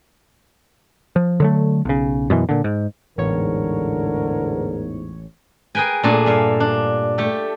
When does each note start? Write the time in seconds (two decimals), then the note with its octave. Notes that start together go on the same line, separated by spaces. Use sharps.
1.16 F3
1.40 D3 F#3 A3
1.85 B1 C#3
2.30 F#2 B2 E3
2.49 A#2 D3
2.64 G#2
3.18 A1 E2 G#2 D3 A#4 C#5
5.75 G#4 A#4 B4 G5 G#5
6.03 A#2 A3 D4 G#4 A4 G#5
6.26 G2 E5 F5
6.60 D4
7.18 A3 G4 A4